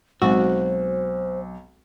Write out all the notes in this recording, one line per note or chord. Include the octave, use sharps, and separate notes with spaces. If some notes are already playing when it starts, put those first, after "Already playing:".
B1 G#3 C4 F#4 C5